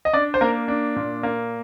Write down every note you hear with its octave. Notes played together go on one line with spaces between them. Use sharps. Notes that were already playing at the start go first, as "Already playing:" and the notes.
D#5
D4 D5
C5
A#3 A#4
D4
A#2
A#3